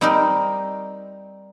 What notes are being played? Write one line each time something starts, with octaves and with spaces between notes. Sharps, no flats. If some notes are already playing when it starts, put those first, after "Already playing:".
G3 C4 D#4 A#4 D#5